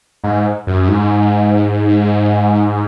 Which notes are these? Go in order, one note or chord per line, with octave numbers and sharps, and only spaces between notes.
G#2
F#2
G#2